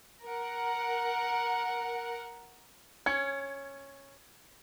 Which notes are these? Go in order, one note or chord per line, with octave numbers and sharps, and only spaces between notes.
A#4 F#5
C#4 G#6 C#7